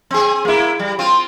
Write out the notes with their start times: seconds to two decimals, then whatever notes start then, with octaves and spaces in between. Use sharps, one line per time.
0.11 C4 G#4
0.45 A#3 E4
0.79 G3
0.99 C4 F4